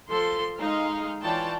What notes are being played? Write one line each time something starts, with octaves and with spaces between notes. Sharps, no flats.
F3 A4 C6
G#3 D#4 D#5 F5
E3 F4 C#5 D5 G5 A5